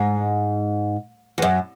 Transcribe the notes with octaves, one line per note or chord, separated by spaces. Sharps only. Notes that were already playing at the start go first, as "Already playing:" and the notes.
Already playing: G#2
E2
F#2